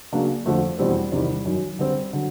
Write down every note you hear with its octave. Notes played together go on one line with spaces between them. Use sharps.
C#3 F#3 A#3 D4
F2 D3 F3 A3
E2 B2 G3 C4
E2 C3 D#3 G3
F#2 D#3 F#3
D3 G3 C4
D3 F#3